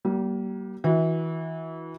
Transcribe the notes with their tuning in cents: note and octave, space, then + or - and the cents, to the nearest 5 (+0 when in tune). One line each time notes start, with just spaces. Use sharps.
G3 -35 A#3 +20
E3 -30 F#4 -30